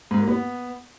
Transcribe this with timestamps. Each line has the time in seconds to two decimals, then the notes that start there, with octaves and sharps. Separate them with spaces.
0.11 G#2
0.19 A#3
0.28 B3